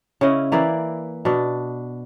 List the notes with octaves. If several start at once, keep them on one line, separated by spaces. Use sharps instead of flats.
C#3 C#4 E4 D#5
E3 A#3 E4 D5
B2 D4